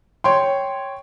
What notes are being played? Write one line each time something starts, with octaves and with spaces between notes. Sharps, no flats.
C#5 G5 C6